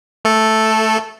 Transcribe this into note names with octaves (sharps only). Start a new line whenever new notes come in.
A3 A4